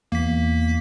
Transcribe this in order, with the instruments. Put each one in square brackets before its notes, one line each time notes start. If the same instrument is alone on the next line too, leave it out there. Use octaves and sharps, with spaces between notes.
[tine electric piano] E2 [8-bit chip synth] A#3 B6